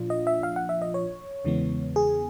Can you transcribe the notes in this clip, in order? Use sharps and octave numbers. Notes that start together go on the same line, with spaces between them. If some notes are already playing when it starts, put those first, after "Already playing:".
Already playing: A#2 F3 D4 F4
D#5
E5
F5
F#5
E5
D#5
C#5
E2 C#3 E3 G#3 B3
G#4